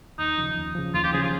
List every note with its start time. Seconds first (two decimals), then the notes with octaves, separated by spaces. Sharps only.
0.18 D#2 D#4
0.38 C#3 F3
0.57 D#2
0.75 C#3 F3
0.94 D#2 F4
1.04 G4
1.13 C#3 F3 G#4
1.23 F4